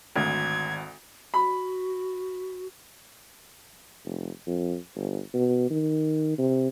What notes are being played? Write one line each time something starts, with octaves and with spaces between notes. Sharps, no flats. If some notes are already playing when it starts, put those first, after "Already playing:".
G#1 D2 G#6
F#4 B5
F1
F2
G1
B2
D#3
C3